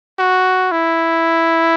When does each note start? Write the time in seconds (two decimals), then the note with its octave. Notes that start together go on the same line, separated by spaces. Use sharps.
0.19 F#4
0.71 E4